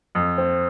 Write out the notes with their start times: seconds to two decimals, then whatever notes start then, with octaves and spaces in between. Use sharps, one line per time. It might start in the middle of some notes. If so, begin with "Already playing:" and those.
0.15 F2
0.38 C4